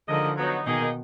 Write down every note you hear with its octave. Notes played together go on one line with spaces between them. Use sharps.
D3 F3 G#3 D#4 A#4 D#5
F#3 B3 D#4
B2 D#3 A#3 D#4 G#4